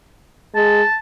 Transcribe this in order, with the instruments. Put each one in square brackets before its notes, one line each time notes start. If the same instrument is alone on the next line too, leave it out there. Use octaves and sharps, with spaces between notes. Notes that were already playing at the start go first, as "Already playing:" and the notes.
[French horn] G#3 [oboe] A5